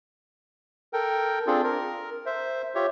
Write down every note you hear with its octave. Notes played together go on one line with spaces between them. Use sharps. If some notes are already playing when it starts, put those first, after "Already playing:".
A4 A#4 G5
C4 D4 F4 G#4 A4
A#4
C5 E5
F4 G4 C#5 E5